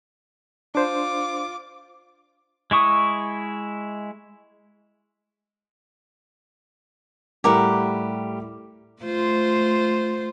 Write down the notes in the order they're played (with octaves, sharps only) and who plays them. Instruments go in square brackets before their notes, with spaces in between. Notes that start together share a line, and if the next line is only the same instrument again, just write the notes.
[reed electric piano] D4 C5 [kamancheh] F4 D6
[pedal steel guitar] G#3 E4 C#6 D#6
[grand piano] A2 G3 [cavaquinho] G4 A#4 F#5
[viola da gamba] A3 F4 C5